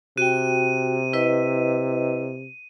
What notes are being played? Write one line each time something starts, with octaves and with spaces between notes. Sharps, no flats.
C3 F#4 G5 D#7
E4 B4 D#5